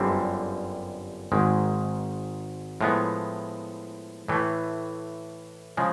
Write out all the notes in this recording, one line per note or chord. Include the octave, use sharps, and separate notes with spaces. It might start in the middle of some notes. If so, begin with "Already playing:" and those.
Already playing: G1 F#2 D3 G3 C4
G#1 G#2 D#3 G#3
A2 F3 G#3 B3
A2 E3 A3
C#3 F3 G#3